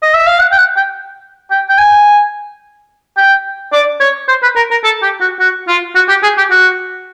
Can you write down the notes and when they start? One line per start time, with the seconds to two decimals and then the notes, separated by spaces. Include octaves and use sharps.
0.02 D#5
0.14 E5
0.27 F5
0.39 F#5
0.51 G5
0.58 F#5
0.76 G5
1.51 G5
1.69 G5
1.78 G#5
3.17 G5
3.73 D5
4.00 C#5
4.28 C5
4.42 B4
4.56 A#4
4.71 A#4
4.84 A4
5.02 G4
5.21 F#4
5.40 F#4
5.68 F4
5.95 F#4
6.09 G4
6.23 G#4
6.37 G4
6.51 F#4